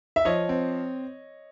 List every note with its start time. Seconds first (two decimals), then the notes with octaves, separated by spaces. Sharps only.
0.16 E5
0.25 F3 C#5 D#5
0.49 C4